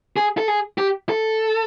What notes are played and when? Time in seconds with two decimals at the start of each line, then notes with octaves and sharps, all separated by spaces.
0.17 G#4
0.38 A4
0.48 G#4
0.78 G4
1.09 A4